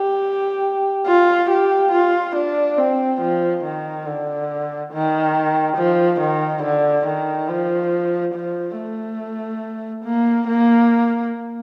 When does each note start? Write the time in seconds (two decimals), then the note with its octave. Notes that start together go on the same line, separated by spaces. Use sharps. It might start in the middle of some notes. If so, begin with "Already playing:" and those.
Already playing: G4
1.06 F4
1.50 G4
1.92 F4
2.36 D4
2.77 C4
3.21 F3
3.64 D#3
4.05 D3
4.92 D#3
5.77 F3
6.20 D#3
6.63 D3
7.06 D#3
7.48 F3
8.34 F3
8.77 A3
10.04 A#3
10.47 A#3